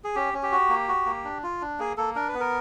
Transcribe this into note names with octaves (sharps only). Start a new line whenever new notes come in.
G#4
C#4 G4
C#4
G4
F#4
A#3
F#4
A#3
D4
F4
D4
A#3 G#4
A#3 A4
D4 A#4
B4
B3
A#4